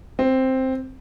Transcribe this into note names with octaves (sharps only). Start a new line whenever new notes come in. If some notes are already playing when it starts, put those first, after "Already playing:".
C4